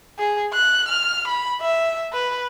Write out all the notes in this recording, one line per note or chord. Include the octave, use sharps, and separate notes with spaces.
G#4
F#6
F6
B5
E5
B4